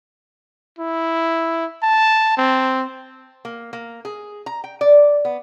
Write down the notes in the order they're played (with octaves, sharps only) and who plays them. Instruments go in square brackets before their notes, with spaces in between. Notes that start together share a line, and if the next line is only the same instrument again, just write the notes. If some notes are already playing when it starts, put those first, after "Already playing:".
[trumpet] E4
A5
C4
[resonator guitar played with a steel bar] A#3
A#3
G#4
A#5
G5
D5
B3